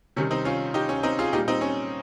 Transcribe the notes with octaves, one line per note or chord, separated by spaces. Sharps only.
C3 D#3 G3 C#4
C4 D#4
C#4 F4
D#4 G4
C#4
C4 D#4
F4 G#4
A#2 G3 D#4 G4
C4 D#4
C#4